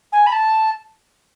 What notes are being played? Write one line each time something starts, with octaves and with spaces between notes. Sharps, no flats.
G#5
B5
A5